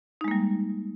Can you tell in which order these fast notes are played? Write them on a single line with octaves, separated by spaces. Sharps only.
D#4 G#3 A#3 G3